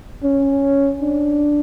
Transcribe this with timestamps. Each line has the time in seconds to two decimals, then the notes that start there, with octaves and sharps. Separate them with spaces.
0.24 C#4
1.02 D4